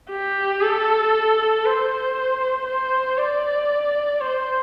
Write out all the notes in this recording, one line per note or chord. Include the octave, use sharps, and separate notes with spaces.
G4
A4
C5
C5
D5
C5